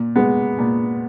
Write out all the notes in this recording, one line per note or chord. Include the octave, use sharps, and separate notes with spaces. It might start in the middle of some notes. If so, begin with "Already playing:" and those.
Already playing: A#2
G#3 B3
A#2